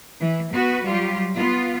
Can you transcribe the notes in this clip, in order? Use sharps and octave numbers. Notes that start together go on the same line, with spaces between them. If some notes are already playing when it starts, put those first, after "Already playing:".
E3
B3 F#4 B4
F#3 G3 F4 G4
B3 F4